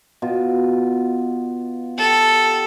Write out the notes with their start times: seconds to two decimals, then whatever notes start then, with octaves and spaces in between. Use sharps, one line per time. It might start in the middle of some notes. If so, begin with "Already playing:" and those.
0.22 B2 F4
1.98 G4 A4